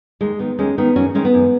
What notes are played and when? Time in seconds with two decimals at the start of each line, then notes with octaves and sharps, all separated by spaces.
0.21 D#2 G#3
0.39 D#3 B3
0.59 D#2 G#3 C#4
0.78 D#3 B3 D#4
0.96 F#2 C#4 F#4
1.15 D#3 G#3 C#4
1.25 B3
1.34 F#2